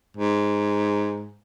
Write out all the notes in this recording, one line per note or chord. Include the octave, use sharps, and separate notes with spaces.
G#2